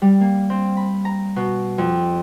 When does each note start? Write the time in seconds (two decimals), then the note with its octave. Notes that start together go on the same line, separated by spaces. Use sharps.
0.02 G3
0.21 A#3
0.50 C4
0.77 B5
1.05 A#5
1.36 B2
1.78 F2